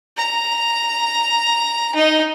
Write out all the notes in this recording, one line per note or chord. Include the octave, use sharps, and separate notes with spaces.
A#5
D#4 D#5